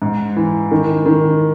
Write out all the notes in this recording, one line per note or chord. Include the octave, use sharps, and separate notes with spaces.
G#2
E3
D#3
D#3